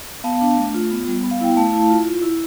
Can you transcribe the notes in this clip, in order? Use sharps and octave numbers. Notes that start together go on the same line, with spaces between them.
B3 F5 A5
D4
A3
F4
B3
G3
B3
F5
E4 G5
A3 F5 A5
E4
F4
F4
E4